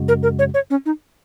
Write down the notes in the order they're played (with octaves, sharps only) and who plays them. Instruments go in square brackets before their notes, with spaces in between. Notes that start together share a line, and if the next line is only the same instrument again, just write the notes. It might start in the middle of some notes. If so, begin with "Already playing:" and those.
Already playing: [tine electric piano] F#2 C#3 G#3 F#4
[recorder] A#4
A#4
C#5
C#5
C#4
D#4